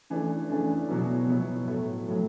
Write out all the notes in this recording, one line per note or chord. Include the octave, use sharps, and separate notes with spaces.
C#3 E3 A3 D4
C#3 E3 A3 D4
B2 F#3 B3 E4
B2 F#3 B3 E4
A2 F#3 A3
A2 F#3 A3